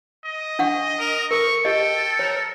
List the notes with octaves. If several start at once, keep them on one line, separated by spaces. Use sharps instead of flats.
D#5
D4 F#5 C#6
A#4
A4 A#4 C#6
G4 A4 D#5 G5
A#4 C#5